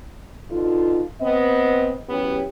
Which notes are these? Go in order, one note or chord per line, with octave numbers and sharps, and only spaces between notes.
B2 D3 D#4 F4
B3 C4 D#5
F#3 B3 C#4 E4 G4